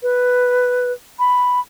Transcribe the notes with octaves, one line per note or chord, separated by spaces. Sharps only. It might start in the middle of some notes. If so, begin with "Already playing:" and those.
B4
B5